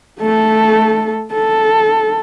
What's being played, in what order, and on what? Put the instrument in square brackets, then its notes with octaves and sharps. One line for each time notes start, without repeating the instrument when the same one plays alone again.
[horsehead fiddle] A3 A4
A4